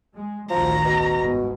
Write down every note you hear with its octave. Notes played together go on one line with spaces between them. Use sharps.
G#3
A1 D2 D#3 F3 A#5
B2
G1 G#2